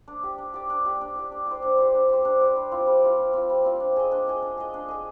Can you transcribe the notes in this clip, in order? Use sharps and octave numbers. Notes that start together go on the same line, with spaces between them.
D4
G4 D5
D4
G4 D5
D4
G4 D5
D4
G4 D5
D4
G4 C5
D4
G4 C5
D4
G4 C5
D4
G4 C5
G3
C4 F4
G3
C4 F4
G3
C4 F4
G3
C4 F4
D4
G#4 D#5
D4
G#4 D#5
D4
G#4 D#5
D4
G#4 D#5